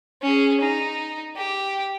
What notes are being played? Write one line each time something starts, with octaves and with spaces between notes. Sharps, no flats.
C#4 G#4
D#4
G4